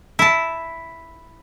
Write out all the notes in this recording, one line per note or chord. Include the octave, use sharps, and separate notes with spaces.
E4 A5